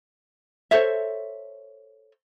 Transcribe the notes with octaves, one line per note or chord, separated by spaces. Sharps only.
A4 C5 C#5 E5